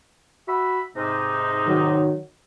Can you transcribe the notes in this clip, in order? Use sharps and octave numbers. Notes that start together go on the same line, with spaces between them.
F#4 E5 B5
G#2 C3 D#4
D#3 F#3